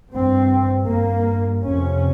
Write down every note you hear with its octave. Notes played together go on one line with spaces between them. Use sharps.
G2 C4
G2 A#3
F2 C3 C#4